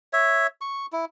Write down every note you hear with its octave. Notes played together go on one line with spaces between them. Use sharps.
C#5 E5
C#6
E4